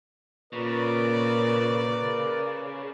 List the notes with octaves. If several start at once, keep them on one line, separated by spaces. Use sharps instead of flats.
A#2 C#3 A#4 B4 D5